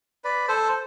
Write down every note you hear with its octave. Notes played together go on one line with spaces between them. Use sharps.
B4 D5
A4 C5